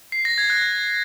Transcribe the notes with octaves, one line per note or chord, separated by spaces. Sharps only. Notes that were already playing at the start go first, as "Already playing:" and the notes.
C7
A#6
G#6
F#6